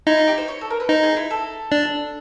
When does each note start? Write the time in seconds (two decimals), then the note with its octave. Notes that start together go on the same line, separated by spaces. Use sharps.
0.07 D#4 E4 D#5
0.17 F4
0.28 G4
0.38 C5
0.48 C#5
0.61 A4
0.70 A#4
0.80 B4
0.89 D#4 C5 D#5
1.03 G#4
1.17 E4
1.30 A4
1.72 D4 D5